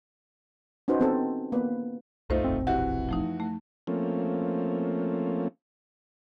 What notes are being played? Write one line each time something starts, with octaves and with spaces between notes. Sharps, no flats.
C#4 D#4 F#4 B4 C5
B3 C4 A4
A#3 B3 B4
C2 F#2 A3 D#4 F4 C5
E1 A#1 C4
E3 F#4 G4 E5 F#5
F3 A3 D#4
A3
F3 A3 A#3 C4 C#4